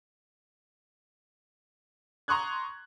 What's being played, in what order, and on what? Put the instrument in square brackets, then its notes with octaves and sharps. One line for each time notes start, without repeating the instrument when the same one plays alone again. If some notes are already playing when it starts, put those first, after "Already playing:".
[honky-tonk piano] A#5 C6 C#6 D#6 F#6 G#6